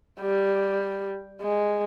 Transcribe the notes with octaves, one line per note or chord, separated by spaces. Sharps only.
G3
G#3